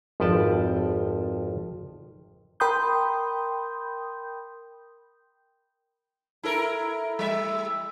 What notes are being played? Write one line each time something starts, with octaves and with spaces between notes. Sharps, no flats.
G#1 F2 F3 B4 G5 A5
A#4 G5 B5 C6 D#6 G6
E4 A4 A#4
G3 E5